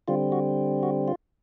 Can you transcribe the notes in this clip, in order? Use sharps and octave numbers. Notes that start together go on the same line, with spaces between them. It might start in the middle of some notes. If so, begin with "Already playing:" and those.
D3 G3 C4 F4
F#4
F#4
F4